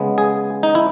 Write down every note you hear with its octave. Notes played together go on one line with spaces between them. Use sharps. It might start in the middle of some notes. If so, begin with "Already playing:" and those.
Already playing: C#3 G#3 B3
G#4
D#4
E4